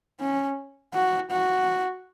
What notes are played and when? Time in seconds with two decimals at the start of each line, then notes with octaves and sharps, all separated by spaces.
0.20 C#4
0.94 F#4
1.30 F#4